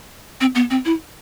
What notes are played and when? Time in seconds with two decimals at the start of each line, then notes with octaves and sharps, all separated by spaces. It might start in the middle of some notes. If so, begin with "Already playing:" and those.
0.41 C4
0.55 B3
0.70 C4
0.85 E4